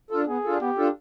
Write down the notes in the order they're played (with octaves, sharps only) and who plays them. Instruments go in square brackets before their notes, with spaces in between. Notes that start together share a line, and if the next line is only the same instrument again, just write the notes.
[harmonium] D4 F4 A4
[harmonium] B3 [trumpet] G#4
[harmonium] D4 F4 A4
[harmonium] B3 [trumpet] G4
[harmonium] D4 F4 A4